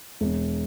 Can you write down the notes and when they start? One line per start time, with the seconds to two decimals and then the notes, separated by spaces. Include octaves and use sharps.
0.21 E1